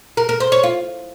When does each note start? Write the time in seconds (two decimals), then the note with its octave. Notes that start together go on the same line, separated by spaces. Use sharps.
0.17 A#4
0.29 A#4
0.40 C5
0.52 C#5
0.63 F4